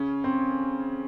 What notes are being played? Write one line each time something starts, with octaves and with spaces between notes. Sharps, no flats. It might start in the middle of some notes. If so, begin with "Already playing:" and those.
Already playing: C#3 C#4
C4